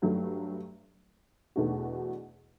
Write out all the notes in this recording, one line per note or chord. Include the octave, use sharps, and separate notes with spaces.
G2 F#3 A3
E2 B2 A3 D4 F#4